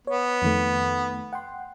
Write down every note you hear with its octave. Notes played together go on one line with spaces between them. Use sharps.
B3 C#5
F2 D#3 A3
F#5 G5 C6